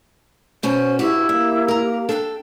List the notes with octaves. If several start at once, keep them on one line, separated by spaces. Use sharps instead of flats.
B2 C#4 F#4 C5
G2 E4 F#4 G4
A#3 E5
A#4 A#5
D4 A4 G5